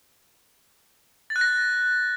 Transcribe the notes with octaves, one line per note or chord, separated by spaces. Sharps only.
A6
F#6
A#6